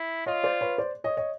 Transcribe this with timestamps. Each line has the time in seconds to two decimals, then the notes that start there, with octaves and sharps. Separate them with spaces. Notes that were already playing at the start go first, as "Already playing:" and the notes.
Already playing: E4
0.26 F4 C#5 D#5
0.44 C5 D5
0.61 B4 C#5
0.78 C5 D5
1.04 C#5 D#5
1.17 C#5 D#5